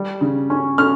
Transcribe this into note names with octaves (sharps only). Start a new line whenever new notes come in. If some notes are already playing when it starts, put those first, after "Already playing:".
Already playing: G3
C#3
C#4
C#4 F6